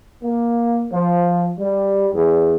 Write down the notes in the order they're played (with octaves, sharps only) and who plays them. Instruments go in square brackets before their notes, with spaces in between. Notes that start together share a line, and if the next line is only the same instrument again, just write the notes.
[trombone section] A#3
F3
G3
E2